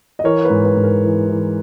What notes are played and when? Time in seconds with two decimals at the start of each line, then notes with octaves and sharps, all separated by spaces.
0.19 D#5
0.24 E3 A#4 C#5
0.45 B4
0.50 G#2
0.64 B4
0.77 G#2
0.84 A#4
1.04 E3
1.30 E3